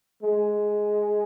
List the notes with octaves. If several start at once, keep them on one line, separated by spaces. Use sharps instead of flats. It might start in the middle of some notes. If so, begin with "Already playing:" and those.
G#3